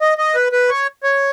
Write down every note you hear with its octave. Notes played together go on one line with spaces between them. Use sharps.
D#5
D#5
B4
B4
C#5
C#5